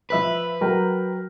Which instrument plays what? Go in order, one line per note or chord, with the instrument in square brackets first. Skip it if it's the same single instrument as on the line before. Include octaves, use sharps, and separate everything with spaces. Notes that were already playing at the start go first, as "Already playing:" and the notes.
[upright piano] F3 E5 B5 [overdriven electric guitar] B4
[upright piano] F#3 A#4 G5